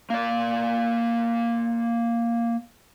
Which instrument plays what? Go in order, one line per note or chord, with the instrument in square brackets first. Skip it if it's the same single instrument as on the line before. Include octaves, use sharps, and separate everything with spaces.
[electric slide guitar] A#3 D5